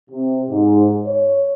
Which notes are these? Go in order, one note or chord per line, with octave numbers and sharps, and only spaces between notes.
C3
G#2
C#5